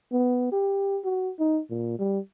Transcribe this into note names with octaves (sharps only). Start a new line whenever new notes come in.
B3
G4
F#4
D#4
A#2
G3